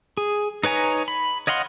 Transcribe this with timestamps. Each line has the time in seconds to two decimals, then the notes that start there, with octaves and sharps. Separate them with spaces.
0.17 G#4
0.64 D#4 B4 C#5 G#5 A#5
1.08 B5
1.47 C#5 D#5 F5 F#5 C6